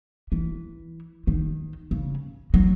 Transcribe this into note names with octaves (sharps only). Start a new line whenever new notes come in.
E3
D#3
C#3
F#3